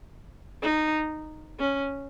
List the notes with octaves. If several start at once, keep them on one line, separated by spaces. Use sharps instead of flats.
D#4
C#4